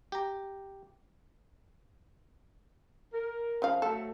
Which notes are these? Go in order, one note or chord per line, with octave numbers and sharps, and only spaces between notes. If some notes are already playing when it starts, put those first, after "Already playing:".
G4 A#5
A#4
C#3 F3 F5
F#3 A3 A4